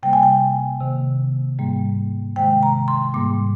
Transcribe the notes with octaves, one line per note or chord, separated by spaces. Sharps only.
C3 G3 A#3 G5
G#5
G5
C3 D#3 A#3
G#2 G3 A#3
C3 D#3 G#3 G5
A#5
C6
G#2 G3 A#3 D6